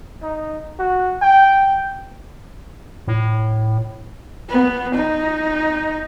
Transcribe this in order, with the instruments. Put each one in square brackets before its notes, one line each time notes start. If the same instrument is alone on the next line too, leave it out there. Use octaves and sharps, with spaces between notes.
[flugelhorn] D#4
F#4
G5
[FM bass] A2
[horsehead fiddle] B3
D#4